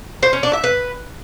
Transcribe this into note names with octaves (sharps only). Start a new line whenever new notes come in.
C5
C#4
D4
E5
B4